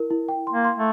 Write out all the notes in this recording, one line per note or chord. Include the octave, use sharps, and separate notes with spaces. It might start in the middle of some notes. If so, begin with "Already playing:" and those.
Already playing: E4 A#4
E4
G5
C6
A#3
C6
A3